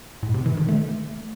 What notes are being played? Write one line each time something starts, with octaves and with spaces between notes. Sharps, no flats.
A2
C3
E3
D#3
A3